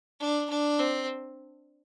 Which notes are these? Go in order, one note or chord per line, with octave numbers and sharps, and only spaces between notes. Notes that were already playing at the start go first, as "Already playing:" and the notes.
D4
D4
C4